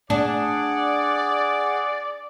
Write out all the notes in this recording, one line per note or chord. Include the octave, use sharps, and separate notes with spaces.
D4 G#4 D5 F#5